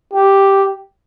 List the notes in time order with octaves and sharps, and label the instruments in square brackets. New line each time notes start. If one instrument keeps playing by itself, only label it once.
[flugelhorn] G4